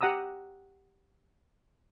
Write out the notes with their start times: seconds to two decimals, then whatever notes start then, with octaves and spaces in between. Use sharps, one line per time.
0.01 G4 F#5 A#5 D#6 E6